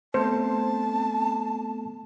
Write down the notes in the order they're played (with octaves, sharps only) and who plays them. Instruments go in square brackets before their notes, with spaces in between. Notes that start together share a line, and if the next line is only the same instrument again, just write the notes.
[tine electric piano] A3 B3 A4 [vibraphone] C4 [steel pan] C5 [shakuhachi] A5